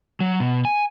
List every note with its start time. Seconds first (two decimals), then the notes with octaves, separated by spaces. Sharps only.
0.20 F#3
0.40 B2
0.65 G#5